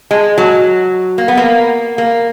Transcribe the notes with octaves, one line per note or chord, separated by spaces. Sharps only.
G#3
F#3
A#3
B3
A#3
A#3